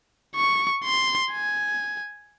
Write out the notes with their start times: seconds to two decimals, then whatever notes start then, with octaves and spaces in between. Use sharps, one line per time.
0.36 C#6
0.84 C6
1.32 G#5